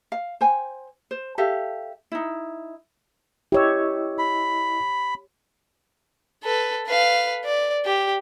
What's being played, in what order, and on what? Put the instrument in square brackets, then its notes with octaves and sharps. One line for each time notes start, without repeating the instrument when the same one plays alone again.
[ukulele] F5
C5 G5 G#5
C5
G4 A4 E5 F5
D#4 E4
[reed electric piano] E4 D#5 E6 [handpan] G4 C#5
[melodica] B5
[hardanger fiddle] A4 B4
B4 F5
D5
G4